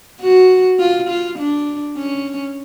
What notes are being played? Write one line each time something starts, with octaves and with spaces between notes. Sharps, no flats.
F#4
F4
F4
D4
C#4